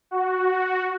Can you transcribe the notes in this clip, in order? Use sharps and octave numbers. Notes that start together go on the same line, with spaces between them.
F#4